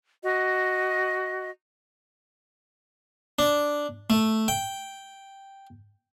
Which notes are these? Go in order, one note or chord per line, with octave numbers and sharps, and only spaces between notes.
F#4 D#5
D4
A3
G5